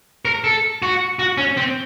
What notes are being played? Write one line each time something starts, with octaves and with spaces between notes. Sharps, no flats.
A#4
A4
F#4
F#4
C#4
C4